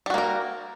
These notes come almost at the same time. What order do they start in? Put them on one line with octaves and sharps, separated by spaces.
G3 F#4 A#3 A#4